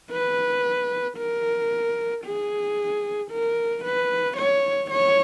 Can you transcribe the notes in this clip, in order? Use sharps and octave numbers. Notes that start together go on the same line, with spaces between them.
B4
A#4
G#4
A#4
B4
C#5
C#5